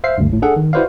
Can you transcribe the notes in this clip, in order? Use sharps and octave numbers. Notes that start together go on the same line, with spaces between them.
C5 E5 F5 C7
D2 G2
G#1 A2
D4 G#4 A4 F#5
D#3
E4 F#4 B4 C5 D5 F5